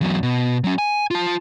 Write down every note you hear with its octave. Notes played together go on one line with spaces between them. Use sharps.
E2 F#3
B2
F#3 C#4
G#5
F4 A5